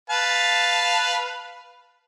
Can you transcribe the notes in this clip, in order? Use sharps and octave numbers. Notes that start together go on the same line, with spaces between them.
B4 F5 A5